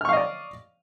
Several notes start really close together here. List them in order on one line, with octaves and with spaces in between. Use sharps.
F6 C#6 F5 D#5 D5